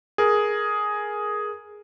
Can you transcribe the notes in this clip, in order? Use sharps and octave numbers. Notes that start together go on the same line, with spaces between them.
G#4 A#4